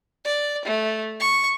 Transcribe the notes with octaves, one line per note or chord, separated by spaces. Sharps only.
D5
A3
C#6